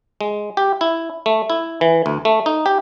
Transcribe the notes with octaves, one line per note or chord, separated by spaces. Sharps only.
G#3
G4
E4
A3
E4
E3
D2
A3
D#4
G4